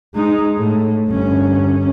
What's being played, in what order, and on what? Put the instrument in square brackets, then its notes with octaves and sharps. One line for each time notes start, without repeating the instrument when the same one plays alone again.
[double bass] G#3 D#4
A2
G1 C#4